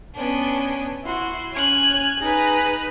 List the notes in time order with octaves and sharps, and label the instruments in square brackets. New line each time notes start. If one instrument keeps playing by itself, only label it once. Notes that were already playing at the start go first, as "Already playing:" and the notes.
[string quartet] B3 C#4 D4
[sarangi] E4 [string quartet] F#4 C6
[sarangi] C#4 [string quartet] G#5 F6 F#6
[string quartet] D#4 B4 [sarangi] G#4